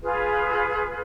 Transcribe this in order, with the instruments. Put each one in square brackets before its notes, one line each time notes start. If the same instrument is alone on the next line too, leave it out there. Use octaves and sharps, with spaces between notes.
[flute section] F4 G#4 B4